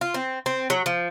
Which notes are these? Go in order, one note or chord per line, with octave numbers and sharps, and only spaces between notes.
F4
C4
C4
F#3
F3